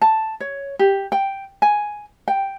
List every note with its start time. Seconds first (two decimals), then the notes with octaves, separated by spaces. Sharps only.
0.02 A5
0.40 C#5
0.79 G4
1.12 G5
1.62 G#5
2.28 G5